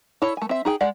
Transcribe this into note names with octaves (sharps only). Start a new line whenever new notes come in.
E4 A4 C#5
A3 G#5
C4 E5
D#4 G#4 G5
G#3 D5 F#5